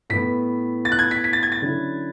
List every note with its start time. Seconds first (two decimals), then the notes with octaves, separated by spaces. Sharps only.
0.10 A2 E3 B3 B6
0.85 A6
0.92 F#6
0.99 G#6
1.11 B6
1.24 B6
1.33 A6
1.43 G#6
1.52 A6
1.62 D3 F#3 C#4 E4